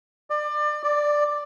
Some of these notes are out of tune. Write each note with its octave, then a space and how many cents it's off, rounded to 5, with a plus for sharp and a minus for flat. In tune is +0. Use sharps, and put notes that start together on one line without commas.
D5 +30
D5 +5